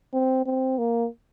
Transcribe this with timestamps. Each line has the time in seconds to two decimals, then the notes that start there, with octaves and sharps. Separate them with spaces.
0.13 C4
0.46 C4
0.78 A#3